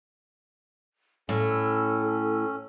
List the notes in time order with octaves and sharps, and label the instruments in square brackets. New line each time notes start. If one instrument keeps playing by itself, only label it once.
[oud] A2 [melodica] C#4 [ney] A4